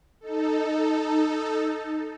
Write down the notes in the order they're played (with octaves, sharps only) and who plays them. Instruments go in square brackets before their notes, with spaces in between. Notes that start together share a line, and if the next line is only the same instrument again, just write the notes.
[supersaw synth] D#4 A4